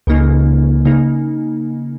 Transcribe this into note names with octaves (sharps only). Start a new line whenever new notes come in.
C#2 C#3 A#3 D#4
C#3 A#3 D#4